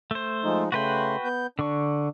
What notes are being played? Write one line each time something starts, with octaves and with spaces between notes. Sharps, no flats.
A3 C5
F3 G#3 D#4
C#3 A3 F#4 B4 G5 C6
B3 G6
D3 D4 C#6